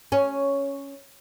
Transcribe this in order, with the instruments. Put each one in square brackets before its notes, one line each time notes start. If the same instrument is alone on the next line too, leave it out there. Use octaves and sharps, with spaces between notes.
[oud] C#4